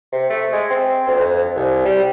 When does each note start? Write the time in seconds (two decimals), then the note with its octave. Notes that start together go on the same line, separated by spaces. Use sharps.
0.12 C3
0.30 A3
0.52 G#3
0.70 C4
1.07 D2
1.19 F2
1.55 C2
1.85 G3